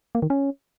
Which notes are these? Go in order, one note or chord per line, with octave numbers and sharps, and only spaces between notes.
A#3
D#3
C#4